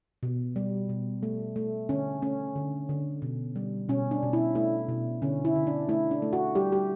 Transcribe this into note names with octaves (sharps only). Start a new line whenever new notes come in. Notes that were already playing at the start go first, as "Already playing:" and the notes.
B2
G3
B2
A3
A3
D3 C#4
A3 C#4
D3
D3
B2
G3
B2 C#4
D4
B2
E4
A3 E4
B2
D3 C#4
E4
D3
D4
A3 E4
D4
A3
F#4
G3 G4
G4